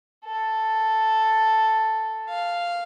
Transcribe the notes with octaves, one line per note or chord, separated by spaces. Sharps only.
A4
F5